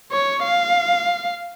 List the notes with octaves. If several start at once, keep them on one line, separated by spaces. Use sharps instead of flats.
C#5
F5